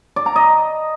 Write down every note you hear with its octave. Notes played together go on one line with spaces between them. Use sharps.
D5
A#5
D#5